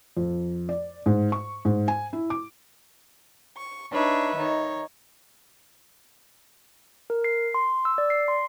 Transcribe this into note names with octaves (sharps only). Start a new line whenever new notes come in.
F2
D5
G#2
C#6
G#2
G#5
E4
D6
C#6
D4 D#4 B4 C#5 E5
D#3 D#4 C#5
A#4
C7
C6
E6
D5
C7
C6